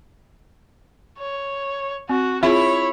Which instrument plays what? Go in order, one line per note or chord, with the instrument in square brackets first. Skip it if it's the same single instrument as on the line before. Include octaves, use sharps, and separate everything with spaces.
[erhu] C#5
[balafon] C4 [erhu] F#4
[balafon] C4 F4 G#4 [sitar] E4 [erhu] C#5